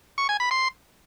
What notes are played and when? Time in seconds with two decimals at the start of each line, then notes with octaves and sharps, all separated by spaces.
0.18 C#6
0.29 G#5
0.40 B5
0.51 C6